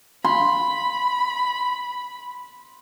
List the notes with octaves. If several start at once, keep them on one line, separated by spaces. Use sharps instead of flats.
B5 C6